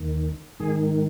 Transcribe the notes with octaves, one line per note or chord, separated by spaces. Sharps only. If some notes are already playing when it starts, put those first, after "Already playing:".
Already playing: D#2 D#3
G#2 D#3 G#4